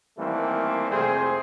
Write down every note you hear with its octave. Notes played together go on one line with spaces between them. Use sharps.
D#3 E3 G3 A3 A#3 C4
F2 C3 A3 C4 G#4 C5